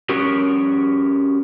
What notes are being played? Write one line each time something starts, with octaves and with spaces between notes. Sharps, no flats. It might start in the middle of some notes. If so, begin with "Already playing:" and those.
C#4 F#4 G4 A#4